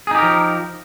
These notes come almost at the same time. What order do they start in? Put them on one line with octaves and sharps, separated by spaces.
G#4 D#4 G4 A#4 F3